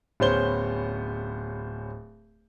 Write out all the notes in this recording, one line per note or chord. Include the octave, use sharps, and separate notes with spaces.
D1 B3 C#4 C5 G7